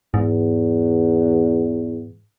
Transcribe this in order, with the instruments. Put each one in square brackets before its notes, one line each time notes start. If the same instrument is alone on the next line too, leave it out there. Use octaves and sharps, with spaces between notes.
[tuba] E2 [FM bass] G#2